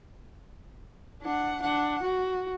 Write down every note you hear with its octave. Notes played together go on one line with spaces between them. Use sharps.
D4 F#5
D4 F#5
F#4